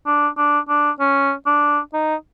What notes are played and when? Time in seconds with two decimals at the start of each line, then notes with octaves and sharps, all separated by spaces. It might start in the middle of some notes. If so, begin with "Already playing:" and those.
0.06 D4
0.38 D4
0.69 D4
1.00 C#4
1.47 D4
1.94 D#4